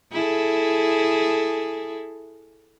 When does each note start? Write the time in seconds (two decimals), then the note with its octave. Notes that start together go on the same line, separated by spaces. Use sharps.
0.12 E4 G#4 A4